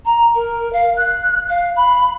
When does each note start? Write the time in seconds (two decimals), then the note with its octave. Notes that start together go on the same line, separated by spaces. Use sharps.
0.06 A#5
0.35 A#4
0.73 F5
0.97 F#6
1.49 F5
1.76 B5